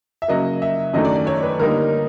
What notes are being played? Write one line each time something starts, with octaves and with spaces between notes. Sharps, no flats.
E5
C#3 F#3 A#3 D#5
E5
F#2 D#3 F#3 A3 D4 D#5
D5
D5
C#5
B4
D3 G3 A#3 D#4 A#4